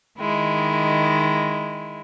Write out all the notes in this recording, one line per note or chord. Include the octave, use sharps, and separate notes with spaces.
D#3 G#3 E4